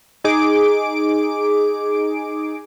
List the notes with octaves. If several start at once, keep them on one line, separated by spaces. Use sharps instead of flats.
D#4 G#4 D6 D7